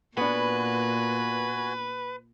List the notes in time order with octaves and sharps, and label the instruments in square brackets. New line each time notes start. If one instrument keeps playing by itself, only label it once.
[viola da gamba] A#2 [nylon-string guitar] B3 D4 [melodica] F#4 G#5 [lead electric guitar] B4